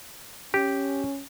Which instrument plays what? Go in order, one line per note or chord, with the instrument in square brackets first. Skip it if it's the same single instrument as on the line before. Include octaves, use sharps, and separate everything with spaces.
[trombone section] C#4 [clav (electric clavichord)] G4